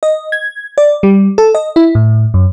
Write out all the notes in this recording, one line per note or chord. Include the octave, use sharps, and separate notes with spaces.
D#5
G#6
D5
G3
A4
D#5
E4
A2
F#2